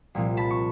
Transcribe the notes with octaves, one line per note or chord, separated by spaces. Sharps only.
C2 A#2 F3
A5 B5
C#6